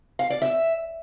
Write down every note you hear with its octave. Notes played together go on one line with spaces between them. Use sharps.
F5
D5
E5